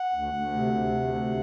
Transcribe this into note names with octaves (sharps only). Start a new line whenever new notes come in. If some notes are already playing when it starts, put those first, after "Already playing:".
Already playing: F#5
D2
D2
C3
C3
D2
C3